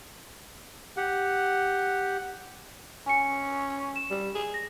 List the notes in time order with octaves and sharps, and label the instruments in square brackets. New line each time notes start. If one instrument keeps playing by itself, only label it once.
[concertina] G4 F#5
[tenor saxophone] C#4 [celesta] G#5 C#7
[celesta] E7
[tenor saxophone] G3
G#4
[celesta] A#6